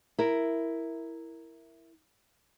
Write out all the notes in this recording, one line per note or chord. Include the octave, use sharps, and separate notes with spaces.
E4 A#4